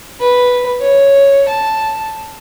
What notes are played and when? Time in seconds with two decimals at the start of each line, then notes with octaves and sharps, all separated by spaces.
0.20 B4
0.81 C#5
1.48 A5